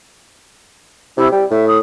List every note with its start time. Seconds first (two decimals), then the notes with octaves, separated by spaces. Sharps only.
1.17 C3 E4
1.32 G3 G5
1.51 A2 E5
1.68 D#6